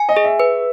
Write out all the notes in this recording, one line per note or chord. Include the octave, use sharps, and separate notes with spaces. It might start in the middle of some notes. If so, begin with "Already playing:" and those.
Already playing: G#5
D#5
G#4
E5
B4